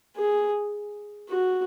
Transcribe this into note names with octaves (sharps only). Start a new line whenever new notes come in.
G#4
F#4